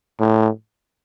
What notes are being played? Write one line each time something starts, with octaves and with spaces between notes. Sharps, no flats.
A2